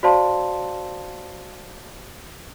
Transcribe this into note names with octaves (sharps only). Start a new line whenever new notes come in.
F#4 C5 D5 F5 A5 C6